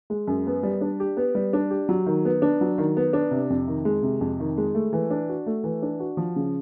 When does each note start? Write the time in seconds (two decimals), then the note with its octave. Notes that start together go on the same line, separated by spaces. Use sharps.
0.10 G#3
0.28 F#2
0.47 B3
0.63 G3
0.81 D4
1.00 G4
1.17 B3
1.35 G3
1.53 D4
1.70 G4
1.89 F#3
2.06 D#3
2.25 B3
2.42 D4
2.61 F#3
2.78 D#3
2.97 B3
3.13 D4
3.31 C3
3.50 F2
3.68 D#3
3.85 G#3
4.03 C3
4.21 F2
4.40 D#3
4.57 G#3
4.75 A3
4.93 E3
5.11 D4
5.29 F#4
5.46 A3
5.64 E3
5.82 D4
6.00 F#4
6.17 F3
6.36 C#3